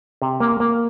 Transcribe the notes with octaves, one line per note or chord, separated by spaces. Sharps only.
C3
A#3
A#3